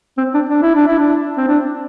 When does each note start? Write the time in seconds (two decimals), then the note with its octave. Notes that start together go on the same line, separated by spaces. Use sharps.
0.18 C4
0.34 D4
0.49 D4
0.62 E4
0.75 D4
0.87 E4
0.99 D4
1.37 C4
1.48 D4